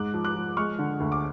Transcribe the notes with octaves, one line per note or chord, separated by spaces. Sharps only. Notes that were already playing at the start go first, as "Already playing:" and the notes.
Already playing: G#2 D6 F#6
F3
D6 F#6
F3
G#3 C#6 F6
D3
D2
D6